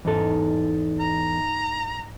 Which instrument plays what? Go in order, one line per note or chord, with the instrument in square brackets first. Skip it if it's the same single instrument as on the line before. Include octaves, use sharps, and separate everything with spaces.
[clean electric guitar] E2 A4 [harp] G#2 D#4
[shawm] A#5